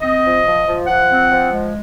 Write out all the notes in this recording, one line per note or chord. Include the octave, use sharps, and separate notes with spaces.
C4 D#5
F3
F3
F3
F3 F#5
C4
F3
G#3